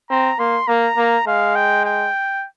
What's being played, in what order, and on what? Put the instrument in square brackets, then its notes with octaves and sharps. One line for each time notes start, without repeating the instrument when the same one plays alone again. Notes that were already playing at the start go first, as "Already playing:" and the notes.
[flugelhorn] C4 [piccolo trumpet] A#5
[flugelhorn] A#3 [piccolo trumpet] C6
[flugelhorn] A#3 [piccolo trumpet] A#5
[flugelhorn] A#3
[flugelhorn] G#3 [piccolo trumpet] F5
[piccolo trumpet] G5
G5